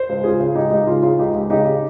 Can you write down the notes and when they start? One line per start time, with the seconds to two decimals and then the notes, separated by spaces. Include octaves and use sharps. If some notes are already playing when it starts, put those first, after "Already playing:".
Already playing: C5
0.09 C#2
0.24 C#3 F4 G#4
0.40 C#3
0.55 C#2 D#4 G4
0.71 C#2 D#4
0.87 C#3 F4
1.03 C#3 F4
1.19 C#2 D#4 G4
1.35 C#2
1.50 C#3 D#4 G4
1.67 C#3